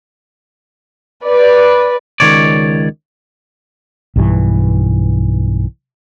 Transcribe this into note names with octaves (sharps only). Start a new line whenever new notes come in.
B4 D5
C#2 F#2 D#3 C#5 D5
B1 G2 E3